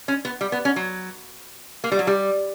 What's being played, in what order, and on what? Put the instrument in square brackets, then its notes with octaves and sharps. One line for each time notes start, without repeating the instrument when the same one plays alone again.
[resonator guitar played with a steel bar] C#4
B3
G3
B3
C#4
F#3
A#3
G3
F#3
G3